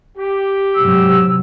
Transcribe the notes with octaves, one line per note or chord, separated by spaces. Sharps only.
G4
G#2 C3 F#3 E6